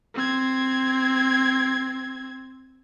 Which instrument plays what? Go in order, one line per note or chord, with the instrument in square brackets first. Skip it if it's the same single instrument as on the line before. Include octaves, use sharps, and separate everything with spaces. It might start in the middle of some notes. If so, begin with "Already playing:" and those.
[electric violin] C4 G#6